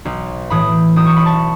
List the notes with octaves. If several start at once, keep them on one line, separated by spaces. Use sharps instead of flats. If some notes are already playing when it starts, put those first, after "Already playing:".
B1
A2 E3 B5 D#6
B1 D#6
C#6
B5
A5 C#6